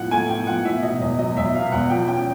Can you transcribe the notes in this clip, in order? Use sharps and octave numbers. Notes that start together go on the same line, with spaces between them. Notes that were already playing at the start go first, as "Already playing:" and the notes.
Already playing: A2 F3 F#5
A3 G#5
A2 G5
F3 F#5
A2 E5
B2 D#5
E2 D#5
F#3 D#5
E2 E5
B2 F5
E2 F#5
F3 G5
C#4 G5